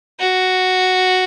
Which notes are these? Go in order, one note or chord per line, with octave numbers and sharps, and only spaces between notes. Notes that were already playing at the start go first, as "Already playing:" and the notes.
F#4